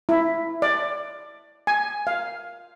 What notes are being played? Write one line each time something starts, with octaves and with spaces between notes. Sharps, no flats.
E4
D5
G#5
F5